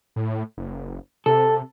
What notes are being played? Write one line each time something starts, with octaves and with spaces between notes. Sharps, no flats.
A2
F#1
C3 A4